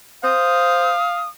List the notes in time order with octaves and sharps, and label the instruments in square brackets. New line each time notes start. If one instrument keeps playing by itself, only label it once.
[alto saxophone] C5 [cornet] F5 [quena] D#6